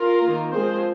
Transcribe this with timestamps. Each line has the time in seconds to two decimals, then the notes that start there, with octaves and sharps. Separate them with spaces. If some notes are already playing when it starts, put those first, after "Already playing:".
Already playing: F4 A#4
0.22 D#3 A#3
0.53 F3 G#3 C4 G#4 C5